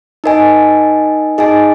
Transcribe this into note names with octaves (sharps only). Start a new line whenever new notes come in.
D#4 A#4 D#5 G#5
D#4 G#4 D#5 G#5